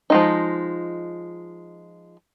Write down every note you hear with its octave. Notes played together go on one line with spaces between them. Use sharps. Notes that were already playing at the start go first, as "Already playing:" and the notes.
F3 G#3 D#4